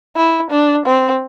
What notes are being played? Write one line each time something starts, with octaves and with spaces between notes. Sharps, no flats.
E4
D4
C4